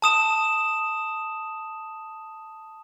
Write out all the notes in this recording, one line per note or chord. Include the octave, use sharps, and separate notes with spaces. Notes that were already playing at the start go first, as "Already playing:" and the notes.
A5 D#6 E7